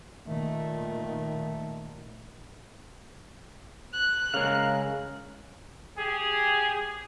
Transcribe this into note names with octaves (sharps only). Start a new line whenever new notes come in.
A#2 D#3 A3
F#6
C#3 G#3 A#4 F5
G4 G#4